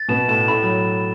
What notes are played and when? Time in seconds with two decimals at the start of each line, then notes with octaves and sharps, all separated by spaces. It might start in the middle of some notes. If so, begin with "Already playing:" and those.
Already playing: A6
0.08 B2 B3 E7
0.28 A2 A3 E7
0.48 A2 A3 B5
0.62 F#3